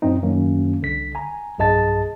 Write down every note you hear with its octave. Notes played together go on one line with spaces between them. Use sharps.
F#2 A#2 C4 D#4
F#2 D#3 A#3 C#4
C2 D3 B6
G#5 A#5
B1 G2 G#4 D#5 A5 A6